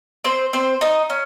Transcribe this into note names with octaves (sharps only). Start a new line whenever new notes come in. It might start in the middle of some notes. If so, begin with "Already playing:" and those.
C4 C5
C4 C5
D#4 D#5
C#4